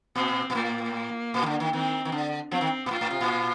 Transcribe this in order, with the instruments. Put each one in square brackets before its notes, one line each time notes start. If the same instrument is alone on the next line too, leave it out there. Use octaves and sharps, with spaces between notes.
[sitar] A#2 [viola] C4
[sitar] A#2
[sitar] A2 [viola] A#3
[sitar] A#2
D#3
D3
D#3
[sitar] D#3 [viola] C4
[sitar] D#3
D3
[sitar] F3 [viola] C4
[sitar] D#3
A#2
[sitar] A2 [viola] F4
[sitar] A2
C3
A#2